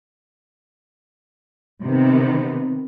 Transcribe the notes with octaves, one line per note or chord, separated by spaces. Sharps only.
C3 D#3 B3